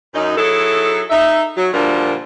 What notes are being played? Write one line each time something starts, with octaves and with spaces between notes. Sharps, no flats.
F#2 D#4
F#3 D#4 E4 G#4 A4
D#4 E5
F#3
A#2 D3 F3 G3 D4 A#4